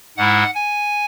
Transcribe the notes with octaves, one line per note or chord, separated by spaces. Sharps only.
G#2 G#3 E4 F#5
G#5